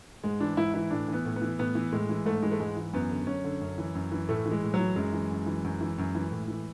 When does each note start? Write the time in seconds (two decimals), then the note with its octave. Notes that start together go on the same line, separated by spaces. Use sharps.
0.23 G#2 G#3
0.40 E3 D4
0.57 G#2 E4
0.74 E3 E4
0.90 A2 D4
1.08 E3 B3
1.25 A2
1.36 B3
1.42 E3
1.59 A2 B3
1.75 E3
1.92 A2 G#3
2.09 E3
2.26 G#2 A3
2.43 E3 G#3
2.51 A3
2.60 G#2 G#3
2.77 E3
2.93 F#2 B3
3.11 D3
3.27 F#2 C#4
3.44 D3
3.61 F#2
3.78 E3
3.95 F#2
4.12 E3
4.29 A2 A3
4.46 E3
4.51 G#3
4.63 A2
4.74 F#3
4.79 E3
4.96 F#2 G#3
5.13 E3
5.31 F#2
5.46 E3
5.64 F#2
5.81 E3
5.98 F#2
6.15 E3
6.31 A2
6.48 E3